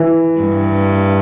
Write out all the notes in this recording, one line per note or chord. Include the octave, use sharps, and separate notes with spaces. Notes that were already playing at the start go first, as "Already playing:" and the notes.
Already playing: E3
G2